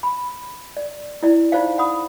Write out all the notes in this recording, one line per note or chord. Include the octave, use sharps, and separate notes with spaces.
B5
D5
E4 D5
D#4 F4 C5 D5 F5
F#5 B5 D#6